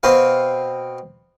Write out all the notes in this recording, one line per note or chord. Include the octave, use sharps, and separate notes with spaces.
B2 C4 B4 F5